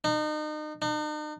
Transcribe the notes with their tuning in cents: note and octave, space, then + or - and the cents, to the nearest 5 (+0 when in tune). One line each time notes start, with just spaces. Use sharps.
D#4 -35
D#4 -45